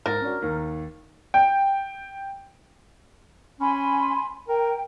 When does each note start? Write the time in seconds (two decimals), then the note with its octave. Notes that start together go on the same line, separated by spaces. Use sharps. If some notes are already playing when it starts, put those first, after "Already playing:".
0.06 G#2 A#4 A6
0.22 C#4 D4 F#4
0.42 D#2 D#3
1.34 G5
3.60 C#4 G#5 B5 C6
4.48 A#4 G5